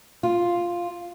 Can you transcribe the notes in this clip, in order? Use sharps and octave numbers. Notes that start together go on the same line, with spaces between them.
F4